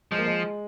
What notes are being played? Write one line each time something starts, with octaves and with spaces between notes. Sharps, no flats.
F3 G#3
A#3
G#3